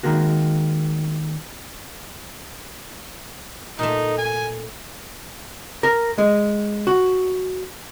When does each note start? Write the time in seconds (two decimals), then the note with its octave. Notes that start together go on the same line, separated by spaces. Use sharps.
0.03 D#3 G#3 A#3 F#4
3.79 A#2 A3 D#4
4.18 G#5
5.83 A#4
6.18 G#3
6.87 F#4